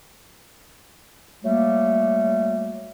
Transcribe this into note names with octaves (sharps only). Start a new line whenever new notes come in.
F#3 G3 A3 A#3